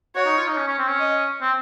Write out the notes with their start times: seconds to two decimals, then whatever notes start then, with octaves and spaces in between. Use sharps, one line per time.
0.16 F#4 C#5
0.25 D#4
0.37 F4
0.48 D#4
0.57 C#4
0.67 C#4
0.78 C4
0.88 C#4
0.99 D#5
1.42 C4